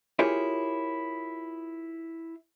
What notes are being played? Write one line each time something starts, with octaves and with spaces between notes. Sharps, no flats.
E4 F4 G4 G#4 A#4 C#5